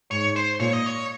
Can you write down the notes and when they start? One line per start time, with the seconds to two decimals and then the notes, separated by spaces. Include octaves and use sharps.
0.11 G#2 C#5
0.36 C5
0.60 A#2 C#5
0.73 D#5
0.86 C#5